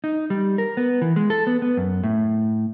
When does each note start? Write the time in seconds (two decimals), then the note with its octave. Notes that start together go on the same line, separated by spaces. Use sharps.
0.04 D#4
0.30 G3
0.58 A#4
0.77 B3
1.02 E3
1.16 G#3
1.30 A4
1.47 B3
1.62 B3
1.77 F#2
2.04 A2